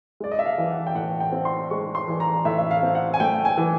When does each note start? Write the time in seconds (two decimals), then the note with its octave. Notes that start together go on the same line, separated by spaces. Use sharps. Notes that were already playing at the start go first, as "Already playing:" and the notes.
0.20 G#3 D5
0.31 D#5
0.39 E5
0.46 F5
0.58 E3
0.71 F#5
0.87 G5
0.95 A2 F#5
1.20 G5
1.32 C4
1.45 C6
1.70 G#3 C#6
1.95 C6
2.08 E3
2.20 A#5
2.45 A2 E5
2.58 E5
2.71 F5
2.83 C4
2.95 F#5
3.14 G#5
3.20 A3 G5
3.45 G#5
3.57 E3